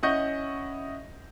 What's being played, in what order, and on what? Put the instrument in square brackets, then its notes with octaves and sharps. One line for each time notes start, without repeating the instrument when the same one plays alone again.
[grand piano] C#4 E4 D#5 F#5 C#6 G6